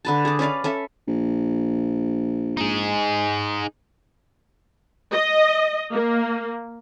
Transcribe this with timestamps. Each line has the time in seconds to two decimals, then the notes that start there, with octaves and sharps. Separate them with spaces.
0.05 D3 B4 A5
0.25 G#4 D5
0.39 C#4 B4 D5 F5
0.64 C#4 A4 E5
1.07 A#1
2.57 D#4 G#4
5.12 D#5
5.93 A#3